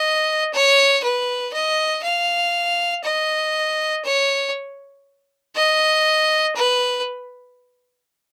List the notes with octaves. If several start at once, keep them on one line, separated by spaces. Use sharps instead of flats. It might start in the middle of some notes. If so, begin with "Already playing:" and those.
Already playing: D#5
C#5
B4
D#5
F5
D#5
C#5
D#5
B4